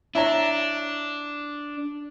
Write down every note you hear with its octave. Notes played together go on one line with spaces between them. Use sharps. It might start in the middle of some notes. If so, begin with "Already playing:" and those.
D4 E4 C#5 A#5